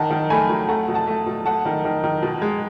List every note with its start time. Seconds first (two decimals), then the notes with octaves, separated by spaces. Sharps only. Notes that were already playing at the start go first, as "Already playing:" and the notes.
Already playing: D#3 F#5 A5
0.11 D#3
0.30 A3 G#5 B5
0.49 F#3
0.68 A3 F#5 A5
0.88 B2
0.94 F#5 A5
1.07 A3
1.26 B2
1.45 A3 F#5 A5
1.65 D#3
1.85 D#3
2.04 D#3
2.22 B2
2.42 G#3